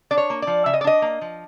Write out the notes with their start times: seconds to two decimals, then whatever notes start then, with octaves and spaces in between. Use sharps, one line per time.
0.11 D4 D5
0.17 C#5
0.30 A#3
0.42 F3 D5
0.66 C#3 E5
0.74 D#5
0.81 D5
0.84 D4 D#5
1.02 A#3
1.21 F3